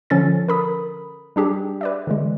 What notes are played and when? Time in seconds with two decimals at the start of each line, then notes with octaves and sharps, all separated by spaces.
0.10 D3 F3 C#4 A4 A6
0.49 A#4 B5 D#6
1.36 G3 D4 G4 G#4
1.81 B4 D5 E5
2.07 D3 E3 G#3